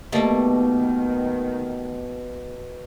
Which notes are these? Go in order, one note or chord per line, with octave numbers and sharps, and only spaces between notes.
B2 D#3 G3 A3 A#3